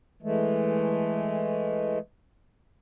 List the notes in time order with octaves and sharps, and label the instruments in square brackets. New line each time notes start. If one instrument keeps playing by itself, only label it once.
[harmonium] E3 G#3 A3